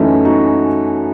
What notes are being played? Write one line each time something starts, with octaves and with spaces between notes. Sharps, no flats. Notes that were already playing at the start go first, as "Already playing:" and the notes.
Already playing: F#2 E3 A3 C#4 D#4
D#4 F#4